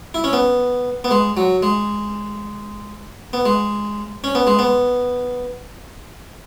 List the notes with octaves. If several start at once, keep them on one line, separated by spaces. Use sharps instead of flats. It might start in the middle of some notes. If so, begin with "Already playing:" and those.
E4
C#4
B3
B3
G#3
F#3
G#3
B3
G#3
C#4
B3
G#3
B3